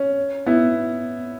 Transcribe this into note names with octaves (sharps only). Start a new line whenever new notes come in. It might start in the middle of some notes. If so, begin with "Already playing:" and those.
Already playing: C#4
B3 E4